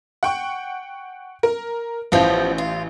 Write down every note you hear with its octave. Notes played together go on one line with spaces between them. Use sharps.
F#5 G5 C#6
A#4
A1 F3 B3 E4 G6
F4